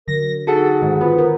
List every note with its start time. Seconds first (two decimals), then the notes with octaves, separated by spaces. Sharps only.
0.08 D3 F#3 A#4 A#6
0.47 D#4 F#4 G#4 A4 F#5
0.82 G#2 D#3
1.01 B3 F4 C5
1.18 A#4